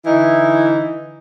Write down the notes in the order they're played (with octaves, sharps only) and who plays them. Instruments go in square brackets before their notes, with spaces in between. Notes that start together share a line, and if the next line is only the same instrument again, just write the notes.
[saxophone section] D3 E3 D#4 E4